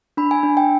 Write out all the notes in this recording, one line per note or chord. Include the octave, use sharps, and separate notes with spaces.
D4 B5
G#5
D4
G5